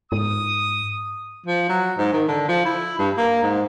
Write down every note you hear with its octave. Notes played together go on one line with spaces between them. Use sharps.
G#2 D#6
F3
F#3
G#2
D#3
D3
F3
E4
G2
A#3
G#2